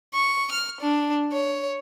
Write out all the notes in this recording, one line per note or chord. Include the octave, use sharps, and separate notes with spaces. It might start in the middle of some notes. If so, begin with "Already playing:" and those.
C#6
F6
D4
C#5